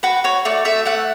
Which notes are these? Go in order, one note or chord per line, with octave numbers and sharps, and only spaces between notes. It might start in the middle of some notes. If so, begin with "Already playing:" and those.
F#4 B4
F#4 C#5
A3 D5
A3 E5
A3 F#5